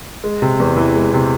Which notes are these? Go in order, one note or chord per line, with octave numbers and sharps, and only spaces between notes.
G#3
C3
E2
E3
G#3
C3